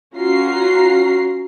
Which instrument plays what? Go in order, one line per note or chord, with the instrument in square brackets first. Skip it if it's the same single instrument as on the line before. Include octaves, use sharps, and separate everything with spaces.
[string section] C#4 F4 F#4 A#5 C7